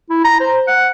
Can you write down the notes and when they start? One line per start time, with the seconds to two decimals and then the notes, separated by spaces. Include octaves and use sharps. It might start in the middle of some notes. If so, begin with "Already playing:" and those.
0.10 E4
0.24 A#5
0.40 C5
0.67 F#5